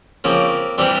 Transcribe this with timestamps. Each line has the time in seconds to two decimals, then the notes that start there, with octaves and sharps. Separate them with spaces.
0.24 C#3 F3 A#3 C4
0.78 C3 E3 G3 C4 D4